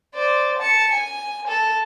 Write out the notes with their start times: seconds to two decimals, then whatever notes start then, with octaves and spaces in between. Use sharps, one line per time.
0.15 C5 D5
0.59 A5 C#7
0.93 G#5
1.47 A4